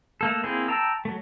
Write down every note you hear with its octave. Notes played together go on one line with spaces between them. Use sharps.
A3 A#3 A4
A#3 C4 E4 G#4
G5 A5 A#5 E6
F#3 A3